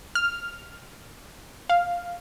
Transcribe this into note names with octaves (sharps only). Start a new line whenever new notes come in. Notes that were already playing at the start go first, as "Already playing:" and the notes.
F6
F5